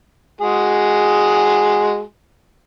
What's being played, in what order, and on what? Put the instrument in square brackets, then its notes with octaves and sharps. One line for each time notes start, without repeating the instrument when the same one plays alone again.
[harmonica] G#3 F#4 G#4